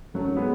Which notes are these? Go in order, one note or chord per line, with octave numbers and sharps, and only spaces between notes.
F#2 F#3 A3
G#2
G#3 B3